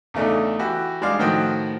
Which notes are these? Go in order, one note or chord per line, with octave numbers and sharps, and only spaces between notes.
E2 C#3 A3 D4 D#4
E3 F#4 G4
G3 G#3 D4 D5 F5
A2 D#3 F3 F#4 D#5 G5